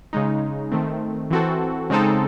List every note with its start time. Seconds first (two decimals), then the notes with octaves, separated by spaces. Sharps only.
0.13 C#3 G#3 D#4
0.71 D#3 A3 C4
1.31 E3 C4 F#4 A4
1.90 C#3 G#3 C4 D#4 A4